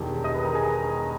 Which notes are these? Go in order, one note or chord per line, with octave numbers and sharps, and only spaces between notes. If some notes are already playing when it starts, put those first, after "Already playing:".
Already playing: E1 E2 D#3 G#3 G4
D#5 D#6
B4 B5
A#4 A#5
G#4 G#5